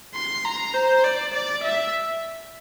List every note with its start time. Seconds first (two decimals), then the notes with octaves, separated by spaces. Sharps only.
0.15 C6
0.45 A#5
0.75 C5
1.04 D5
1.34 D5
1.64 E5